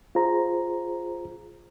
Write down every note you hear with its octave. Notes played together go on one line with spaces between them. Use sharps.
F4 G#4 C5 A#5